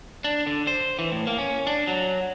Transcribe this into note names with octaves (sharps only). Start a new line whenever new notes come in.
D4
D3
C5
E3
A2
A#3
C#4
D4
F#3